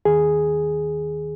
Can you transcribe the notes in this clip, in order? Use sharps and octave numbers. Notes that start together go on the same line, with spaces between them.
D#2 D#3 G#4